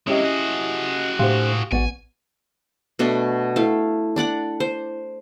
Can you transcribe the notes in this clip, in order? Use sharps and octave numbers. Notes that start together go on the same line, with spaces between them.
C3 G#3 C#4 E4 G4 D#5
F#4 G#4
A2 A3 D4 G4 C5 F5 C6
A1 B3 F#4 D5 F#5 G#5
B2 A3 D4 C6
A3 E4 F5
D4 D5 F#5 D6
C5